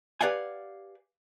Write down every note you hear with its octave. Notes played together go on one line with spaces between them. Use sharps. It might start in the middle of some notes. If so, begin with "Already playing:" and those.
G4 B4 D5 F5 F#5 G#5